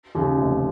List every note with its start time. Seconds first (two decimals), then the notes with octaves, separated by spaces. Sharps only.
0.15 D#2 C#3
0.38 F1